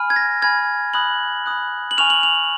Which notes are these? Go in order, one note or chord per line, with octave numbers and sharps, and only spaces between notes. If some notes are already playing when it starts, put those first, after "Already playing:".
Already playing: G#5 B5 F6
G#6
A#6
G#5 B5 F6 G#6
B5 D#6 F#6 F#7
B5 D#6 F#6
F#7
G#5 C#6 F6 F7
F#7
F7